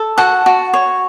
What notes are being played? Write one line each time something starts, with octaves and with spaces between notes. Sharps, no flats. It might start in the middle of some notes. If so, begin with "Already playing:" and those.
Already playing: A4
F#4 F#5 A5
F#4
C#5